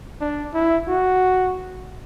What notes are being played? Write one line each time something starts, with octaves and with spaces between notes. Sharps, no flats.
D4
E4
F#4